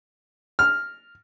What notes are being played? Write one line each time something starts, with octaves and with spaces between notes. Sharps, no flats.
F6